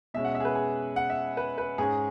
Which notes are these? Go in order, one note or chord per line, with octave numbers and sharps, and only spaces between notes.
B2 G#3 C#4 E5
F#5
E5
G#4
B4
G#4
F#5
E5
B4
B4
G#2 G#3 C#4 G#4